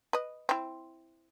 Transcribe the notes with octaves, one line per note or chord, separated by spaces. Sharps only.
B4 D#5
C4 E4